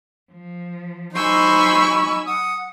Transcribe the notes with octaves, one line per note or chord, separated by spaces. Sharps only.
F3
F#3 D#4 C5 G#5 B5 C#6 E6
F#5 D#6